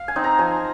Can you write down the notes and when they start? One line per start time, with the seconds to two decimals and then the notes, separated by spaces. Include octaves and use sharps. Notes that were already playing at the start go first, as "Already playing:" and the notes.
Already playing: F5
0.08 G#5
0.16 C4 D#4
0.24 A#5
0.39 F3 G#5